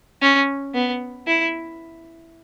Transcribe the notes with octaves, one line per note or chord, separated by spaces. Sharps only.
C#4
B3
E4